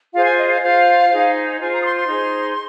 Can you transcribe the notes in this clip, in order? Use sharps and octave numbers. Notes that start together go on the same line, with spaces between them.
F4 G#4 C5 F5
G#5
D#5
F5
F4 C5 F5
D#4 G#4 C5
F4 C5 G#5
A#5
D#6
C6
C6
D#4 G#4 C5